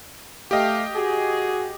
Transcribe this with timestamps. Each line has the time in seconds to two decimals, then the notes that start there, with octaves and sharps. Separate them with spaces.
0.51 A3 G4 D#5 F5 G5
0.94 F#4 G#4